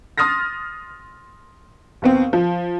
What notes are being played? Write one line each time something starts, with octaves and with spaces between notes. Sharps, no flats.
C6 D#6 F6 A6 A#6
D#2 B3 C4
F3